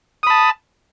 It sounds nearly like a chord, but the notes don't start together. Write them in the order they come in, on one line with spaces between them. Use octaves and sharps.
D#6 B5 A5